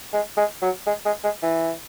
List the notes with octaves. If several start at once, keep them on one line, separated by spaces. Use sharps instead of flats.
G#3
G#3
F#3
G#3
G#3
G#3
E3